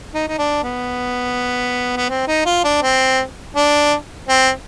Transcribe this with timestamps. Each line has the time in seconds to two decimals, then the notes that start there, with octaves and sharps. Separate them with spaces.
0.14 D#4
0.28 D#4
0.38 D4
0.63 B3
1.97 B3
2.09 C4
2.27 D#4
2.46 F4
2.64 D4
2.83 C4
3.55 D4
4.29 C4